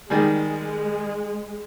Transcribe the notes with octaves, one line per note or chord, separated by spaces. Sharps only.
D#3 G3 G#3 G#4